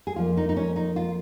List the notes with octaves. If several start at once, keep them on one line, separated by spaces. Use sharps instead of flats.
G#4
F2 F3 A#3 F4
D#4
D#4
C#4
D#4
F4